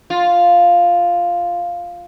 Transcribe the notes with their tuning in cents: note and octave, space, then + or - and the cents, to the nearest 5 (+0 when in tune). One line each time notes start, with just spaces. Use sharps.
F4 +0